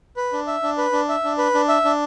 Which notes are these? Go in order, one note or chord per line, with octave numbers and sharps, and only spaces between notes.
B4
D4
E5
D4
B4
D4
E5
D4
B4
D4
E5
D4